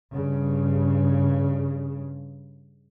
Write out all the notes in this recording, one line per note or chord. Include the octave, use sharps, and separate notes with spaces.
G2 C#3